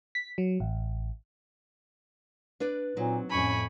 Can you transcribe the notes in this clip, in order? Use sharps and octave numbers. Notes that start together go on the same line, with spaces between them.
B6
F#3
A1
D4 B4 D5
A#2 F#3 C4 D#4
F2 A2 C#4 G#5 B5 C#6